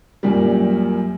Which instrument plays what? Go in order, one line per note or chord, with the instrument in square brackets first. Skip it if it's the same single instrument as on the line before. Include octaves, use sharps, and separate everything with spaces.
[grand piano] F#2 A#2 G3